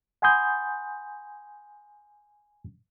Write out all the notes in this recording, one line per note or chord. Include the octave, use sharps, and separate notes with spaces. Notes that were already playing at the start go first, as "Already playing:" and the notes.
F#5 G#5 B5 C6 D#6 G6